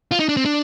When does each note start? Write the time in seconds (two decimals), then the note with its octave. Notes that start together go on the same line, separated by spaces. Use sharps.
0.11 F4
0.19 D#4
0.29 D4
0.37 C4
0.45 D4